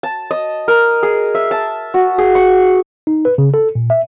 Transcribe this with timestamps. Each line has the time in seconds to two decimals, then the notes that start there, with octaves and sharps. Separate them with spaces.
0.03 A5
0.31 D#5
0.68 A#4
1.03 G#4
1.35 E5
1.51 A5
1.94 F#4
2.18 G#4
2.35 C#6
3.07 D#4
3.25 B4
3.38 C#3
3.54 A4
3.75 A#2
3.90 E5